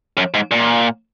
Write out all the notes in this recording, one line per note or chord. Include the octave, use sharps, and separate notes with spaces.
F#2
G#2
A#2